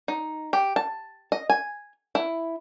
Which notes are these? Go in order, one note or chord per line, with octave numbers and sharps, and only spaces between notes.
D#4
G4
A5
D#5
G#5
E4